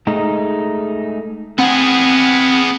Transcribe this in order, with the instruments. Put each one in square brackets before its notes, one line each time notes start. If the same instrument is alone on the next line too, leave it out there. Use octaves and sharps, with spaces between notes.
[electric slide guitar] G#3 A3 D#4
[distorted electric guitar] B3 G#4 [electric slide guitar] C4 F#5